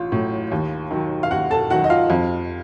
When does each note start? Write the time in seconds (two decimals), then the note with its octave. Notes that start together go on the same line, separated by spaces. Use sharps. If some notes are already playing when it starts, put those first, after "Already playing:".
Already playing: A1 F4
0.12 A2 F#3
0.51 D#2
0.91 D#3 F#3
1.23 F5
1.31 D#2 F#4 F#5
1.51 A4 A5
1.70 D#3 F#3 F#4 F#5
1.84 D#5
1.90 F4 F5
2.10 F2